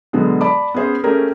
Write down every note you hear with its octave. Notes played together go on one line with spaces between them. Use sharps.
B2 D3 F#3 G#3 B3
D5 A5 B5 D6
B3 C#4 G#4 C5
A3 A#3 C#4 G4 G#4 A#4